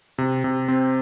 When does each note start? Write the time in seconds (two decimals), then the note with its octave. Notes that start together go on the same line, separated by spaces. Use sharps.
0.18 C3
0.44 C3
0.68 C4